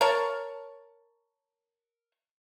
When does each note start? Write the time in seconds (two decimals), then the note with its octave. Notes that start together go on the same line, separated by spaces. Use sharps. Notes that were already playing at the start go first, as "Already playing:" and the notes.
0.01 A#4 C#5 A5